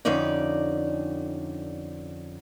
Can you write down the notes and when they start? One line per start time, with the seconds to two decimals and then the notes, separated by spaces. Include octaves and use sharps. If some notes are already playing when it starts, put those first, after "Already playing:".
0.05 F2 D3 C#4 D#4 D5